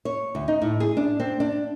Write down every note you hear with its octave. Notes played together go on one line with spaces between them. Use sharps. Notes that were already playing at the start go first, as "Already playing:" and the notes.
C#5
D2
D#4
A2
G#4
D4
C4
D4